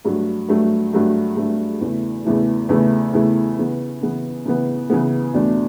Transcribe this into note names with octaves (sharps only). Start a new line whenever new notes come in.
G2 F#3 A3
G2 F#3 A3
G2 F#3 A3
G2 F#3 A3
E2 C#3 E3 A3 E4
E2 C#3 E3 A3 E4
E2 C#3 E3 A3 E4
E2 C#3 E3 A3 E4
C#3 E3 B3
C#3 E3 B3
C#3 E3 B3
C#3 E3 B3
E2 B2 A3 D4